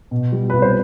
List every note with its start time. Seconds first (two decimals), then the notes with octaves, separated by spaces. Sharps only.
0.11 B2
0.32 G3
0.50 C2 B4
0.62 C5